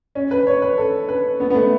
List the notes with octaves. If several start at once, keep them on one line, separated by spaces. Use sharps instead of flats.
C#4
B4
C#5
B4
A4
B4
B3
B3
A3